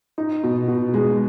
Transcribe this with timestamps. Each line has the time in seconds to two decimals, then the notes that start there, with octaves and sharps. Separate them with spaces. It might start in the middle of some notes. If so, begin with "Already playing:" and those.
0.18 D#4
0.43 B2
0.68 B2
0.94 G#3